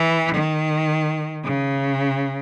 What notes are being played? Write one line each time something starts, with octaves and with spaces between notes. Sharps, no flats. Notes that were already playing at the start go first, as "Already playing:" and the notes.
Already playing: E3
D#3
C#3